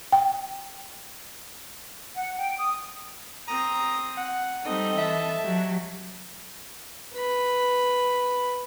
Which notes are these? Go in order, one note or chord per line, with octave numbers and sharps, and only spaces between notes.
G5
F#5
G5
D#6
C4 A#5 D#6
F#5
G3 C4 D#4 A4 D#5
E3 E5 A5
F#3 G4
B4 B5